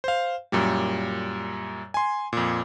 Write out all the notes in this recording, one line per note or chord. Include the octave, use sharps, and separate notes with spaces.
C5 F5
F#2 A#2 G3
G#5 C6
F2 A#2